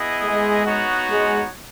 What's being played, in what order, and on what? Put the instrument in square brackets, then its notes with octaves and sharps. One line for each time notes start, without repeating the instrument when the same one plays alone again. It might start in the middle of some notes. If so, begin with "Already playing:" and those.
Already playing: [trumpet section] B3 E4 G#4 D#5
[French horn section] G#3
[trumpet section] B3 D#4 F#4 C#5 F#5
[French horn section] G#3